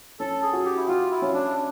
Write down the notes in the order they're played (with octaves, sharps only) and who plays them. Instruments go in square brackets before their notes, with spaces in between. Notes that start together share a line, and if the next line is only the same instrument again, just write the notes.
[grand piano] C#4 [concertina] A4
[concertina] G#4
[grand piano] F#4
[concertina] G4
E4
[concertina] F4 [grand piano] F#4
[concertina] E4
[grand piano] C#4
[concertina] D4